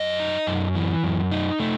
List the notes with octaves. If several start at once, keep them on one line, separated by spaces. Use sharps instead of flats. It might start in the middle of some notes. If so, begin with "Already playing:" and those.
Already playing: F#2 D#5
D#4
F#2
E3
F#2
D#4
A3